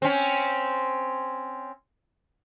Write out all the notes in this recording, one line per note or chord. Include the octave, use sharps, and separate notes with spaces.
C4 C#4